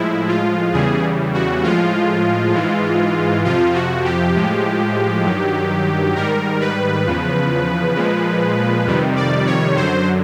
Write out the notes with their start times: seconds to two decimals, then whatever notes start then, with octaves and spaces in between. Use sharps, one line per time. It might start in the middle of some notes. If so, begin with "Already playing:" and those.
Already playing: A2 F3 G#3 E4
0.28 F4
0.72 E2 C#3 E3 G3 G#4
1.34 F#4
1.63 A2 F3 G#3 F4
2.54 G#2 E3 G#3
3.44 F2 C3 F3 F4
3.75 F#4
4.04 G4
4.35 A2 F3 G#3
5.25 G2 D#3 F#3
6.15 G#2 D#3 G3 A#4
6.61 B4
7.06 E2 C#3 F3
7.96 A#2 F3 G#3
8.86 F2 C3 D#3 G3
9.16 D5
9.47 C#5
9.76 F#2 D3 F#3 C5